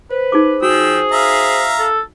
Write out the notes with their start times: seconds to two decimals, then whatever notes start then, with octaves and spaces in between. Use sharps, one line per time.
0.11 B4 C5
0.32 D#4 G#4 D6
0.62 F3 F#4 G#4 G5 E6
1.12 E5 F5 A#5
1.79 A4